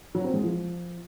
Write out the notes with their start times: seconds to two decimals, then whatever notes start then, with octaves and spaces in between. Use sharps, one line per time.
0.15 F#3
0.24 C4
0.34 G#3
0.43 F3